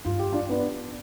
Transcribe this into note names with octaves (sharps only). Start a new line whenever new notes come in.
G2 F4
G4
D4 F4
B3 D4